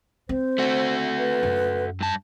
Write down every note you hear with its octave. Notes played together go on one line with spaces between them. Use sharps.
C4 C5
A3 F#4
B4
F#2
G2 A5